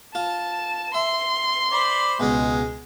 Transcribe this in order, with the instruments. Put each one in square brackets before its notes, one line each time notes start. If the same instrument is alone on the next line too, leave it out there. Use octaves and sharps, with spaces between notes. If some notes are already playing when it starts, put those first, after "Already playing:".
[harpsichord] F4 [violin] A5 E7
[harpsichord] E5 [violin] C6
[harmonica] C5 D5 B5
[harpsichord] C#2 B2 [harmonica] G#3